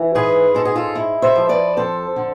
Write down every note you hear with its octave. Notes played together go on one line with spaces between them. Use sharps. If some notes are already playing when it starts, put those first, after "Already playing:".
Already playing: E3
G#2 G#4 B4
G#3 A4
G#4
F4 A4
E4
C5 E5
F3
B4 D5
F2 A4 C5
D3